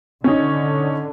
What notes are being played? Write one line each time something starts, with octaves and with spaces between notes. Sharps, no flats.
D3 C#4 D#4